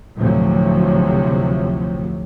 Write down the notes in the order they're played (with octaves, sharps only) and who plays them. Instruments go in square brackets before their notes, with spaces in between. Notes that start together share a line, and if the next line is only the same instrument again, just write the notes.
[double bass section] D2 A2 C3 F3 F#3